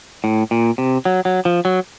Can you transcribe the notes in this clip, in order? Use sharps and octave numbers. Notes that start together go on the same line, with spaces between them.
A2
A#2
C3
F#3
F#3
F3
F#3